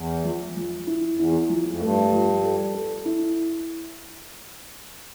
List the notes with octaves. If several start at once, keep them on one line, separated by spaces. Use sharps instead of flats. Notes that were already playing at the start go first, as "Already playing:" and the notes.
Already playing: E2
F3
F3
E4
F2
E2 E4
F3
F2
G2 A3
F3
A4
A4
E4